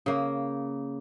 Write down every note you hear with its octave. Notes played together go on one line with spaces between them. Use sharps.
C#3 A#3